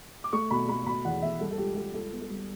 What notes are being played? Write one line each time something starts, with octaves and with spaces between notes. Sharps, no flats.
D6
A3 C#6
B2 B5
A3 B5
B2 B5
E2 F#5
E2 E5
G3 A4
A4
C#2 G4
G3 A4
C#2 A4
B3
A4
G3